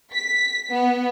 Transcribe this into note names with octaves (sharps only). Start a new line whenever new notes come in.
B6
B3